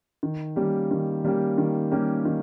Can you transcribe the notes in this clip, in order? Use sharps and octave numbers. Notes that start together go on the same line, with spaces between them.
D#3
G3 A#3 C#4 G4
D#3
G3 A#3 C#4 G4
D#3
G3 A#3 C#4 G4
D#3